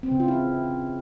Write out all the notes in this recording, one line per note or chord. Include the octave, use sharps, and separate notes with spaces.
C4
C#3
F4
E4